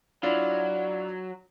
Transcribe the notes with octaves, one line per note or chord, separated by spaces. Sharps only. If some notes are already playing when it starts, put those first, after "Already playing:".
F#3 D4 E4 F4 D5